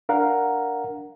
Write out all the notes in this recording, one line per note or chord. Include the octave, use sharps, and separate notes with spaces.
D4 A#4 F5 F#5 A#5